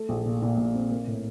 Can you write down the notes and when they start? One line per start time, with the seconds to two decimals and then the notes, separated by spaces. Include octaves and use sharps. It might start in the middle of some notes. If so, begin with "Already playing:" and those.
Already playing: A3
0.09 A#1
0.26 A#2
0.42 A#2
0.58 A#1
0.75 C4
0.91 A#3
1.07 A2